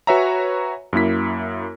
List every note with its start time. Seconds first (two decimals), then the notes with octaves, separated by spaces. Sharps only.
0.07 F#4 B4 C#5 E5 G#5 A#5
0.93 F#2 A#3 E4 B6